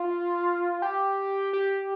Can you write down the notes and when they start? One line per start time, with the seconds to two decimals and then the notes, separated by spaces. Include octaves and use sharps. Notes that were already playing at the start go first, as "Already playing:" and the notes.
Already playing: F4
0.82 G4
1.53 G4